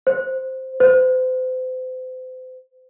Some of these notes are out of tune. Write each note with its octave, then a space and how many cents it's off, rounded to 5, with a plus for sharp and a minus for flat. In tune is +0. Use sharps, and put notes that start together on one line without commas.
C5 +0
C5 -35